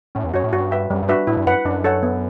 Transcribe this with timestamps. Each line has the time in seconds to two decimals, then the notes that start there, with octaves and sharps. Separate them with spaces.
0.15 A2 C#4
0.24 E2
0.34 F#2 F#4 C#5
0.44 A2
0.53 G2 F#4
0.71 B4 E5 G5
0.90 F#2 G3
1.03 G2
1.09 D4 F#4 B4 E5
1.27 A2 E4
1.37 G2
1.46 F#2 B4 F#5
1.65 F#2 D4
1.84 A4 C#5 F#5
2.03 B3